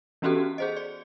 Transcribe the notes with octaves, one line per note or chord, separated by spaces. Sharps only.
E3 B3 C#4 F#4 G4 A4
G#4 C5 D#5
D5